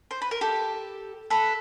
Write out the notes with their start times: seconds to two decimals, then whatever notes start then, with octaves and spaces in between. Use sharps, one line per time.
0.11 C5
0.22 B4
0.31 A#4
0.41 G4 A4
1.30 A4 B4